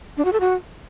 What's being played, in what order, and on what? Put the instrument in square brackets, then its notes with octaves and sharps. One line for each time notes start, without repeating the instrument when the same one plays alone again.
[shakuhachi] D4
F#4
A4
F#4